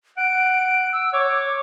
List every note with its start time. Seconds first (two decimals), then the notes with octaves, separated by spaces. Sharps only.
0.17 F#5 D7
0.93 E6
1.13 C#5 D6